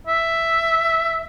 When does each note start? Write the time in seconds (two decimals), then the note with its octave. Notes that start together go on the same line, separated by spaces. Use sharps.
0.07 E5